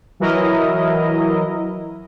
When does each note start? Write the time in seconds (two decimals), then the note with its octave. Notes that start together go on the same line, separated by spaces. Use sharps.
0.20 E3 F#3 E4 A#4 D#5